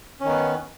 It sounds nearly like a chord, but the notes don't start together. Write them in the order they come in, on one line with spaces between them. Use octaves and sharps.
C#4 D#3 B3